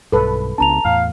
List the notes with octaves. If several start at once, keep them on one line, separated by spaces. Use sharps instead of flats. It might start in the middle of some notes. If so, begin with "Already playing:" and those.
B1 G2 A4 B4
C#2 B3 D4 A5 A#5 F7
E2 A2 F5